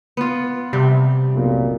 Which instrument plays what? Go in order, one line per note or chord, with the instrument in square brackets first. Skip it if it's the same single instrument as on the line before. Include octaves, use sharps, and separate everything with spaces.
[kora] B3 F4
[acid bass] C3 [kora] G3
[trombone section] B1 F2 A#2